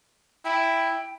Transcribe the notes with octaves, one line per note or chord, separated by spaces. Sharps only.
E4 G5